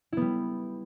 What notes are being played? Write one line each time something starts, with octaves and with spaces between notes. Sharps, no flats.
G3 B3 E4